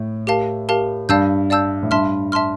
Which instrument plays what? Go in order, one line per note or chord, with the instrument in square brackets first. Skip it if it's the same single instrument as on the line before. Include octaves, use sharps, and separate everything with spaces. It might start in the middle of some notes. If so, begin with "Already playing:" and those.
Already playing: [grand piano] A2
[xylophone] G4 A#4 F5 A5
G4 A#4 F5 A5
[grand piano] G2 [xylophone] D5 F5 A5 E6 G6
[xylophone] D5 F5 A5 E6 G6
[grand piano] A2
[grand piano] G2 [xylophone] E5 A5 C6 F6
[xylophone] E5 A5 C6 F6